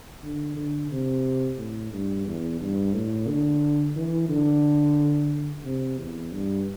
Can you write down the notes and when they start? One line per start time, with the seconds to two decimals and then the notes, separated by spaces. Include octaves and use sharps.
0.23 D3
0.56 D3
0.91 C3
1.58 A2
1.93 G2
2.26 E2
2.60 G2
2.94 A2
3.28 D3
3.96 E3
4.29 D3
5.65 C3
5.98 E2
6.32 G2